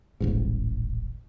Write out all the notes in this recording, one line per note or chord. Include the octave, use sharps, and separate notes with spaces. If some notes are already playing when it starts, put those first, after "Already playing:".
D#1 A1 G#2